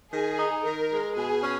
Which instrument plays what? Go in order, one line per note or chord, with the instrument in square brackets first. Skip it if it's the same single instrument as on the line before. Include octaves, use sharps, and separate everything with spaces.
[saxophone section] D#3 [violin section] G#4
[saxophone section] D#4
[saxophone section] D#3 [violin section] A#4
[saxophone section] G#3
[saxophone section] B2 [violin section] G#4
[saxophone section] C#4